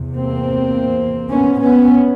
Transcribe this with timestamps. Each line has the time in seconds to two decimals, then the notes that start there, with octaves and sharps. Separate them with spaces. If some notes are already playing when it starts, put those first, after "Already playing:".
Already playing: E2 C3
0.14 A#3 C4
1.31 B3 C#4
1.60 B3 C#4